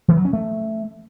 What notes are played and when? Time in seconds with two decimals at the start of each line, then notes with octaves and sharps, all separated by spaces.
0.08 E3
0.17 F#3
0.25 C#4
0.33 A3